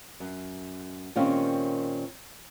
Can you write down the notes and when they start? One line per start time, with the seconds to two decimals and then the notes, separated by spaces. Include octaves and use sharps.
0.20 F#2
1.16 A#2 D#3 C4 C#4 G4 F5